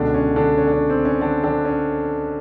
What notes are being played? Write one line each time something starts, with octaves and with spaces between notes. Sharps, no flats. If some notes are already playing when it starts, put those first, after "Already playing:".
Already playing: C#2 B2 D3 D4
C#4
D3 D4
C#4
D4
C#4
C4
C#4
D3 D4
D3 D4
C#4